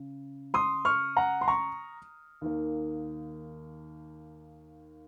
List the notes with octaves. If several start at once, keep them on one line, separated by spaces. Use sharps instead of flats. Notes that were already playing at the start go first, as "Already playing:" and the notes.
Already playing: C#3
C6 D#6
C#6 F6
F#5 A#5
C6
A#5 C#6
D#2 D#3 A#3